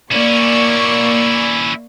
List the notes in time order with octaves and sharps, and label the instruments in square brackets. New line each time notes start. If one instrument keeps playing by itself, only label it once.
[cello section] A#3 [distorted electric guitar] C#4 E4 [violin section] D5 C#6